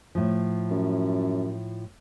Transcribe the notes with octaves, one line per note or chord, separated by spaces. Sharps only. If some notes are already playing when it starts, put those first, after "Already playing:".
A2 F3
F#2